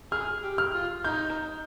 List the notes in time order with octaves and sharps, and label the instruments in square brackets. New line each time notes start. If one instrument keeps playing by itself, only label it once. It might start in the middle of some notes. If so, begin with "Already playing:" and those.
[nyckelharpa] G#4 [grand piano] F6
[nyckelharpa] G4
[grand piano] F6
[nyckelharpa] F4
[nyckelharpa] D#4 [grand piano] G6